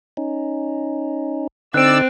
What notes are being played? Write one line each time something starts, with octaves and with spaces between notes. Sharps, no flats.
C#4 D#4
D3 C4 D#4 D5 E6 F#6 D7